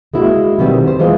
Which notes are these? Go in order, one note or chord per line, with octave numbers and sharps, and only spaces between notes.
G#3 A#3 E4 F#4
B2 D#3 G3 B3 C4
C5
E3 G#3 B3 F4